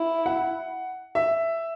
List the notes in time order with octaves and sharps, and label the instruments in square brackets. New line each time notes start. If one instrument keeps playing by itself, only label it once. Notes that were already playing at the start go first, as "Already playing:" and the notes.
Already playing: [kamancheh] E4
[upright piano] F#5
E5